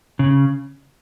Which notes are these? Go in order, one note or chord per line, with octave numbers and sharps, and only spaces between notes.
C#3